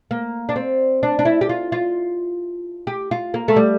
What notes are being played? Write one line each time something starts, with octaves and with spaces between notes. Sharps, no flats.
A#3
D4
C4
D4
D4
E4
G4
F4
F4
G4
F4
A#3
A3
G3